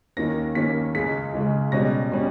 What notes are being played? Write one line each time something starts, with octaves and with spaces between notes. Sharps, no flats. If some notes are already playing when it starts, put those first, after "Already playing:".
D#2 D#3 A#3 C#4 A#6
D#2 D#3 A#3 C#4 B6
C#2 C#3 G#3 B6
C#2 C#3 G#3
C#2 B2 G3 C#4 A#6
B2 G3 C#4